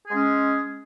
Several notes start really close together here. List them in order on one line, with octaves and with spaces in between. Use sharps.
G#4 G#3 C#4